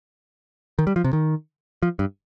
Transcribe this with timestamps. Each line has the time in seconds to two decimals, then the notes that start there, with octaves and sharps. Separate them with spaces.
0.79 D#3
0.87 G3
0.96 F3
1.04 C3
1.13 D#3
1.83 F3
1.99 G2